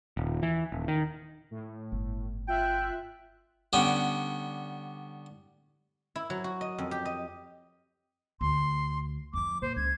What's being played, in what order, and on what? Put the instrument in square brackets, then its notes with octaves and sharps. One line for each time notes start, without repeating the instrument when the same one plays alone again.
[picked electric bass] D#1
E3
D#1
D#3
[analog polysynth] A2
[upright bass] G1
[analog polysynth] F4 E5 F#6 [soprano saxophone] G5
[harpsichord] D3 G3 B3 C#4
[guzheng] E4
F#3
F#4
D#5
F2
G4
D#5
[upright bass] D2 [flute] C6
[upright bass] F2 F3 [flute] D6
[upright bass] A#2 [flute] C5
[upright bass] C#2 [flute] G#6